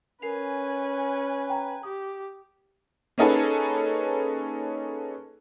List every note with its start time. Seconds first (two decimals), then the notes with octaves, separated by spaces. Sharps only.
0.22 C#4 A#4 B4 G#5 C7 F7
1.50 G5 A#5
1.83 G4 D#6
3.18 A#3 C#4 D#4 G#4 A4 B4